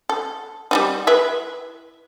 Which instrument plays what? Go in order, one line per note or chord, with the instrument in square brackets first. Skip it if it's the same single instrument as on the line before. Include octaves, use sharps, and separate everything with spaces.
[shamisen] A4
G3 D4 D#4
E4 B4 E5